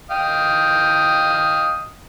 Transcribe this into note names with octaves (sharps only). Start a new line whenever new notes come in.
D#5 F5 G5